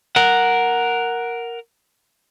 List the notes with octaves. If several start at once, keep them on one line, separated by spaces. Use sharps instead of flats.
A#4 F#5